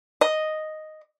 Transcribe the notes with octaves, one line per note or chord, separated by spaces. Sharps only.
D#5